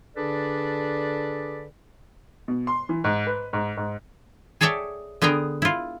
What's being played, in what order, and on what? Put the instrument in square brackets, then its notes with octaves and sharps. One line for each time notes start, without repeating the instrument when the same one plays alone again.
[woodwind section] D3 D4 G#4 A4 B4 D5
[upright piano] B2
C6
E3
G#2
B4
G#2
G#2
[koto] G#4 A4 C#5 D5 E5 G5
D3 B3 G#4 A#4 G5
E4 F4